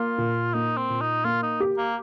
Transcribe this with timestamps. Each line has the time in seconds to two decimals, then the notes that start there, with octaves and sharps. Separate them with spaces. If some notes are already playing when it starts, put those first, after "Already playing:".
Already playing: A#3 F4
0.18 A#2
0.54 A#3 D#4
0.78 C4
0.90 A#2
1.01 D#4
1.24 A#3 F4
1.43 D#4
1.60 G4
1.78 A#3